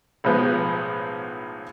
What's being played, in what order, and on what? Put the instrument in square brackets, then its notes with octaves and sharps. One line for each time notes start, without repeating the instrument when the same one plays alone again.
[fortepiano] B1 A2 F3 G#3 B3